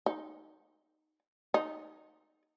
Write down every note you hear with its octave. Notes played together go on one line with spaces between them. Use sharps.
D#4
D#4